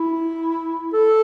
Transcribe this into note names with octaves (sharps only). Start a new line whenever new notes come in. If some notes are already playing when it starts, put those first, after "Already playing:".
Already playing: E4
A4